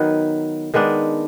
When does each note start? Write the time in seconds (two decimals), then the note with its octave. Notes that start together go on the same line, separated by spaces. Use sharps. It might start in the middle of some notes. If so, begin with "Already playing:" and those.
Already playing: D#3 F#3 B3 B4
0.74 D#3 G#3 B3 D4